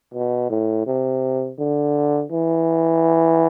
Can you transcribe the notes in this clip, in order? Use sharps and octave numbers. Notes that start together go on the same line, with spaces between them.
B2
A2
C3
D3
E3